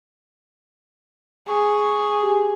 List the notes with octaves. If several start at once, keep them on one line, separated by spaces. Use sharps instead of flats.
G#4 C#6
G4